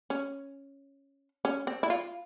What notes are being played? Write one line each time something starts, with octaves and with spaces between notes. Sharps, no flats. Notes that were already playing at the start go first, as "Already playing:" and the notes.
C#4
C#4
C4
E4
F4